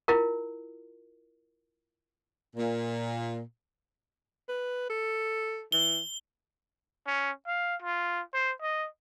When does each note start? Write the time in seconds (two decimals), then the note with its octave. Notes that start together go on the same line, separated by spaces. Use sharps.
0.08 E4 F4 A#4
2.56 A#2
4.49 B4
4.90 A4
5.72 E3 G7
7.07 C#4
7.47 F5
7.82 F4
8.33 C5
8.62 D#5